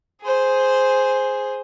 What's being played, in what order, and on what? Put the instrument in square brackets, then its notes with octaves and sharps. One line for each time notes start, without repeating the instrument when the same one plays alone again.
[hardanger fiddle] G#4 C5